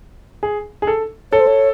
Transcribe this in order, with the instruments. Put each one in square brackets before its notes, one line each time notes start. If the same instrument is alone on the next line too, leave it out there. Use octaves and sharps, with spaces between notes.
[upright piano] G#4
G#4
A4
[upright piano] A4 [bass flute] C#5
[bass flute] C5
C#5